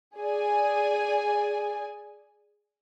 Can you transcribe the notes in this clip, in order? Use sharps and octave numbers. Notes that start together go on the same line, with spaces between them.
G#4 D5 G#5